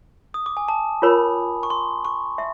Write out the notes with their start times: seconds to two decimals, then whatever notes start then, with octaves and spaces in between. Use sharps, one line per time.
0.34 D#6
0.46 D6
0.57 G#5
0.68 A5
1.02 F4 A#4 C#5 B5
1.63 C#6
1.70 C6
2.05 C#6
2.38 E5